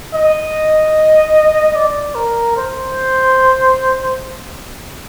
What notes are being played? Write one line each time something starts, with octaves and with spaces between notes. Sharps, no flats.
D#5
D5
A#4
C5